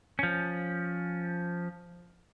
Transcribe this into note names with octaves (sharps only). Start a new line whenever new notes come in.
F3 C#4